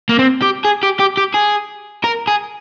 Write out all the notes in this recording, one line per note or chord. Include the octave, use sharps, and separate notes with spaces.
A#3
C4
G4
G#4
G4
G4
G4
G#4
A#4
G#4